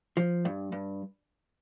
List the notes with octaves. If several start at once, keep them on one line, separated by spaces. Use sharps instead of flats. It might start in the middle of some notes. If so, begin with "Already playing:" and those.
F3
G2
G2